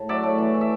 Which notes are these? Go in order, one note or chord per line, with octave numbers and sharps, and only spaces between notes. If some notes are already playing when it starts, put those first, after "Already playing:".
Already playing: A2
F#3 D5 E5
A3
E3
E3
E5